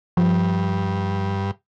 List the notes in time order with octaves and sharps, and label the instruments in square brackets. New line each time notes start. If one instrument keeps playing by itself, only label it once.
[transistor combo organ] G2 [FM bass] F3